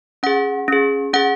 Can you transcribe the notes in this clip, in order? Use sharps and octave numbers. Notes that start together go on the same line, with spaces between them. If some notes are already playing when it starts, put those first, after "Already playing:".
C#4 G#4 F#5
C#4 G#4
C#4 G#4 F#5